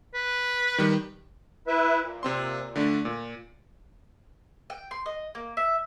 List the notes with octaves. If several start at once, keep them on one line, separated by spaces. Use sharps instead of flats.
B4
D#3 G3
E4 B4 E5
A#2
C3 C4 C6
D3 A3 D4
A#2
G5
C6
D#5
A#3
E5